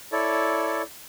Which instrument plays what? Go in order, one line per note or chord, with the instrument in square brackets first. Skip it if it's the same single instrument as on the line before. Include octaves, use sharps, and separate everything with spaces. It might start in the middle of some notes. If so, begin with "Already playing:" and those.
[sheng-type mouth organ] E4 A4 C#5 D5